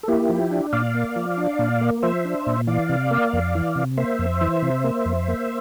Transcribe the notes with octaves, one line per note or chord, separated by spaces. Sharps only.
A4
A#3 E4 G4
F3
D4
A#2 D5 F5
A#3
F3
D4
A#2
A#3
F3 C5 E5
D4
A#2
E3 D5 F5
C3
A#3
F2
E3
C3
A#3 C5 E5
F2
E3
C3
A#3
F2
A#3